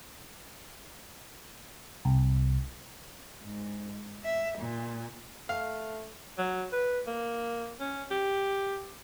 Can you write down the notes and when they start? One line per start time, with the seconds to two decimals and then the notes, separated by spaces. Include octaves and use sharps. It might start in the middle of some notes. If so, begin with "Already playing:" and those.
2.05 C2
3.43 G#2
4.24 E5
4.59 A#2
5.49 A3 F5
6.38 F#3
6.72 B4
7.07 A#3
7.80 C#4
8.11 G4